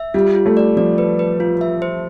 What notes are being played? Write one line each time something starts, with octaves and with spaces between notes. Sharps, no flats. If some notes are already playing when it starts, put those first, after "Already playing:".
Already playing: E5
G3 F4
F4
A3
D5
F3 D5
B4
B4
F4
E5
C5